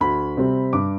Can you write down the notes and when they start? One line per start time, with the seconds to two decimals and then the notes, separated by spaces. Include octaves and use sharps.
0.01 D2 B5
0.37 C3 G3 C4
0.73 G2 D6